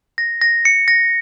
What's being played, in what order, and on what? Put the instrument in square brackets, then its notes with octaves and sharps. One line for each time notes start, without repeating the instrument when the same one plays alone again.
[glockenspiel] A#6
A#6
C#7
A#6